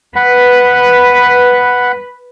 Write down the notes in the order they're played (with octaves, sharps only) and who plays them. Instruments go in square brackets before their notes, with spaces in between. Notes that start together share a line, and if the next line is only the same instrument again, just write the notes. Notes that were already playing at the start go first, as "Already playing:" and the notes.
[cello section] B4 [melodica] F#5 B5